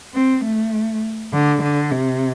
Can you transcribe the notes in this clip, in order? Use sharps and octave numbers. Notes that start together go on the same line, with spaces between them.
C4
A3
D3
D3
C3